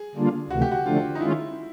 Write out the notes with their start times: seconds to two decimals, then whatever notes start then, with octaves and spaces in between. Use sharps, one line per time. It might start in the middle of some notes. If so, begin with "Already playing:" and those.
Already playing: G#4
0.15 D3 G3 A#3 D4 F4
0.50 D2 C3 E3 A3 F#4
0.62 G4
0.71 F#4
0.86 D3 F3 A3 D4 F4
1.15 D#4
1.20 D#3 G#3 C#4 E4 F4